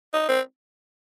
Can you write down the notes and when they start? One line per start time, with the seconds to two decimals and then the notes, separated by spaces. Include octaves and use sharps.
0.13 D#4
0.28 C4